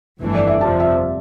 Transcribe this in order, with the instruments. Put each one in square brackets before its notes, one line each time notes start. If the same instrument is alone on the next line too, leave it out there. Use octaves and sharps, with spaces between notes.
[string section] G1 F2 E3 A3 D4
[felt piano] D5
E5
[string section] F2 C3 F3 [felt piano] A5
[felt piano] E5